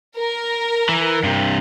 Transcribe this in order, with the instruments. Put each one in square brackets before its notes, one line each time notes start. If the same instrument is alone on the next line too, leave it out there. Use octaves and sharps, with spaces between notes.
[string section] A#4
[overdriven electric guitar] E3
G2 C3